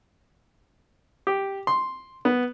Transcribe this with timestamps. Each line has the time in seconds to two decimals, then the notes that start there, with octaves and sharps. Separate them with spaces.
1.27 G4
1.67 C6
2.25 B3